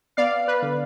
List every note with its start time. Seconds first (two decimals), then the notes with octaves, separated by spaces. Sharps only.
0.17 B3 D5 F5
0.48 B4
0.62 D3